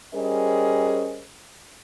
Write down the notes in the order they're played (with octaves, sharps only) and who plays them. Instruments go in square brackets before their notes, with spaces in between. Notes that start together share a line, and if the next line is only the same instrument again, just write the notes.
[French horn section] G3 C#4 G#4 A#4 C5 D#5